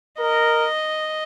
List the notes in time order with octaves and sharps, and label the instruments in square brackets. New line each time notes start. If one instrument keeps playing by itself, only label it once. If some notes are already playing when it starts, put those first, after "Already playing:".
[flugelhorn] A#4 [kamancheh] D#5